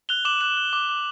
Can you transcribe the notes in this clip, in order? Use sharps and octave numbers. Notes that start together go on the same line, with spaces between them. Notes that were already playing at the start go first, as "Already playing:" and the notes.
F#6 F7 G7
D6 E7 F#7
F#6 E7 F#7
F#6
D6
D6